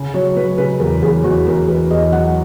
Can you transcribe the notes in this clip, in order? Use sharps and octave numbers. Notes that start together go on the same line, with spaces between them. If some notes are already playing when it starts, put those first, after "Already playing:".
Already playing: C#3
F#3 C#5
F#3 B4
C#3 B4
E2 A#4
E2 G#4
E2 F#4
E2 A#4
E2 B4
E2 D#5
F#3 F#5